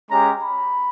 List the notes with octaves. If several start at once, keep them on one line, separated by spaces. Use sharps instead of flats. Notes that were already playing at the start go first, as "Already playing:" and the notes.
G#3 C#4 G4 A#5
B5